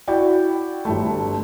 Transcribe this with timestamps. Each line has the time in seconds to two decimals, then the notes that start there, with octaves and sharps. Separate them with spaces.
0.08 E4 F#4 D5 G5
0.85 G1 A3